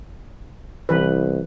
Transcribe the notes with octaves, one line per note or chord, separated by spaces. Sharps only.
C2 E3 B4